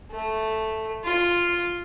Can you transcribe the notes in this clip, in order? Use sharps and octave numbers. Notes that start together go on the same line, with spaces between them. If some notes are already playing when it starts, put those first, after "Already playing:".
A3
F4